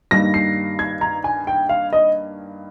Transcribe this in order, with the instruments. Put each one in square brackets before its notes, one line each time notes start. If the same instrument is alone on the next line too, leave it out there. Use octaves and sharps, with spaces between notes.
[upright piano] G2 D#3 G3 A#3 A#6
C7
G#6
A#5
G#5
G5
F5
D#5